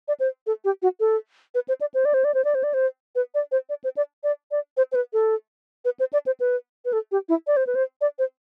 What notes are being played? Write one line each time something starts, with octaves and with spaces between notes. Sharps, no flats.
D5
C5
A4
G4
F#4
A4
B4
C5
D5
C5
D5
C5
D5
C5
D5
C5
D5
C5
B4
D5
C5
D5
C5
D5
D5
D5
C5
C5
B4
A4
B4
C5
D5
C5
B4
B4
A4
G4
E4
D5
C5
B4
C5
D5
C5